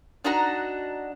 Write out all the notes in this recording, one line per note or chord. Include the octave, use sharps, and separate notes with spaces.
D4 D#4 F#4 A#5